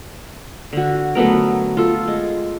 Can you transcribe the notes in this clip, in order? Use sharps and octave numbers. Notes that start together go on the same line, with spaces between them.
D3 F#4
F#3 A3 B3 A#4
F4 A4
G#3